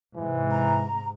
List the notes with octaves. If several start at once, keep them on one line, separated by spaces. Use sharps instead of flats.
G#2 C3 E3
A#5